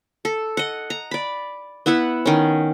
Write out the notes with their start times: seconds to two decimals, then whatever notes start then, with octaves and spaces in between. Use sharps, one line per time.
0.25 A4
0.57 D#5 F#5
0.90 A#5
1.11 D5 B5
1.86 B3 E4 E5 F#5
2.26 D#3 C#4